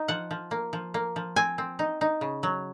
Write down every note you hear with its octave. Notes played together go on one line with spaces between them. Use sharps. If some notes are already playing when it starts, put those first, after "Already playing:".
Already playing: D#4
F3 F#5
F3
A#3
F3
A#3
F3
C4 G#5
C4
D#4
D#4
C#3
F#3